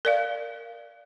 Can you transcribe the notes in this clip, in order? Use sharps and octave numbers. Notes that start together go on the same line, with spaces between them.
A#4 D5 F5